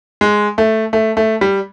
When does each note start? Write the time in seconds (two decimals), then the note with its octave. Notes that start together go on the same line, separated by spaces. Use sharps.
0.21 G#3
0.58 A3
0.93 A3
1.17 A3
1.41 G3